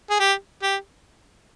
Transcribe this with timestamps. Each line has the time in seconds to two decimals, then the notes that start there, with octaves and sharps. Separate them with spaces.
0.10 G#4
0.19 G4
0.63 G4